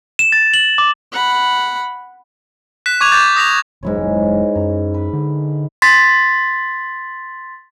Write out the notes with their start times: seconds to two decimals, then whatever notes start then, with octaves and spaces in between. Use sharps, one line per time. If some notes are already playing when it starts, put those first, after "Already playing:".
0.19 E7
0.32 A6
0.54 F#7
0.78 D6
1.12 F#5 B5
2.86 F#6 B6 E7
3.01 C#6 D6 G#6 D#7 F7
3.12 D6 G6 A6
3.36 D#6 A#6 B6 F7
3.83 F1 G#2 F#3 G#3 E4 C#5
4.55 F#2 A#5
4.94 B4
5.13 D3
5.82 C6 A6 B6